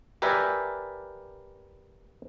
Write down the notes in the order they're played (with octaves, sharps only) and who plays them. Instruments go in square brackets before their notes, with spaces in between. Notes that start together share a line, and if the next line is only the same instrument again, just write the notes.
[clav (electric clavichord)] G4 A#4 B4 D5 E5 G#5